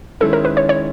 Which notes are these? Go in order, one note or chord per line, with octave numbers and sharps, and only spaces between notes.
D#3 G#3 C#4 E4 A4
A#4
B4
C#5
C#5